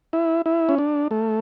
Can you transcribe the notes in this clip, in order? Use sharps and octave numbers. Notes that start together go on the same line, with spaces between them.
E4
E4
C#4
D4
A3